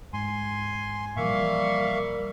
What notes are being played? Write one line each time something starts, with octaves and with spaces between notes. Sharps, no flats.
G#2 G#5 C6
A#2 E3 F3 G3 A#3 E5 F5 C#6